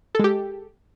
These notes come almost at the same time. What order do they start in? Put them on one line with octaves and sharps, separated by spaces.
A4 G#3 G4